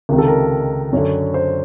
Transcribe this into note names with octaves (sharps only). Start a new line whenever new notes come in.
C#2 C3 D#3 A#4
A4
A#4
F#2 D3 C#5
C5